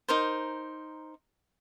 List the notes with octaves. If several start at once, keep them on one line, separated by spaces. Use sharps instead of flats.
D#4 A#4 C5